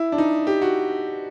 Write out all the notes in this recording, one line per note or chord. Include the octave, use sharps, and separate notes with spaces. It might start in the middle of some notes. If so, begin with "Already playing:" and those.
Already playing: E4
D4
D#4
G4
F#4